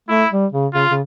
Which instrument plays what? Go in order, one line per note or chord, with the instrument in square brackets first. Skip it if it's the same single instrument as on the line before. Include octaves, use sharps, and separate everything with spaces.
[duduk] A3 [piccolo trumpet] E4
[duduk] G3
C#3
[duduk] C#3 [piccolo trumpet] F4
[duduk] C#3